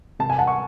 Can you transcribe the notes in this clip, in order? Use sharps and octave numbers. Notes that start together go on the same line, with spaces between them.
C3 A5
G#5
F#5 A5
C#6